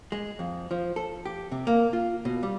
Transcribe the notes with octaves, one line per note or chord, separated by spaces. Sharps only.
G#3
F2
F3
A4
G4
C3
A#3
F4
B2
G3